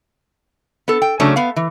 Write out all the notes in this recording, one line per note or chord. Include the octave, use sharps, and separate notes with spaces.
B3 A4
G5
C#3 F#3 A3 C#4 D4
B3 F5
E3